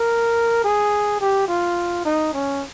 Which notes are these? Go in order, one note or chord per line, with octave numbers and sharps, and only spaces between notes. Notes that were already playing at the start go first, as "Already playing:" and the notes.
Already playing: A#4
G#4
G4
F4
D#4
C#4